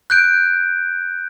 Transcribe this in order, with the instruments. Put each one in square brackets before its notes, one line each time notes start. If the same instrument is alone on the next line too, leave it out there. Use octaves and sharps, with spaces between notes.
[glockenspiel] F#6 G6 D7